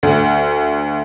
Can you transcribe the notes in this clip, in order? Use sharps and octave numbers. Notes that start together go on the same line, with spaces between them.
D2